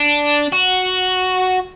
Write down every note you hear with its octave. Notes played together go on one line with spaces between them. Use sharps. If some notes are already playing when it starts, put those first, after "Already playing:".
Already playing: D4
F#4